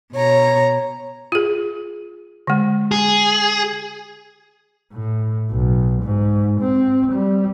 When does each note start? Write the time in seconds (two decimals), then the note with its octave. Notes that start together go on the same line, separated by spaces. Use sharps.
0.12 B2 C#5 A#5
1.32 F4 G#4
2.47 D3 G#3
2.91 G#4
4.93 A2
5.51 B1
6.03 G#2
6.60 C4
7.12 G3